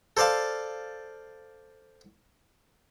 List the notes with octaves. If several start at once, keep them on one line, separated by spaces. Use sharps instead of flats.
A4 C5 D5 F5 A5